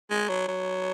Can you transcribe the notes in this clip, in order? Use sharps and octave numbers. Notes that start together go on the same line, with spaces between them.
G#3
F#3
F#3